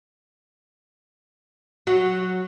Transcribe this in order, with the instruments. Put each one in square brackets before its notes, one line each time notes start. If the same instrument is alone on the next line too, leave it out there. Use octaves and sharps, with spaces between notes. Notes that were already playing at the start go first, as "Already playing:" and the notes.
[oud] F#3 [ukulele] F#4